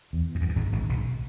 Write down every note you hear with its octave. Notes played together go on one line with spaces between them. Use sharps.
E2
F#2
E2
F#2
G#1 G#2
G#1 G#2
B1 B2